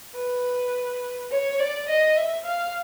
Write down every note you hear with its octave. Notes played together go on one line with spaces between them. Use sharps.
B4
C#5
D5
D#5
E5
F5